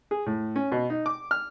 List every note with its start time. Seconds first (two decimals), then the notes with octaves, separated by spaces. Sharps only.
0.11 G#4
0.26 A2
0.56 C#4
0.72 B2
0.90 D#4
1.06 D6
1.31 F6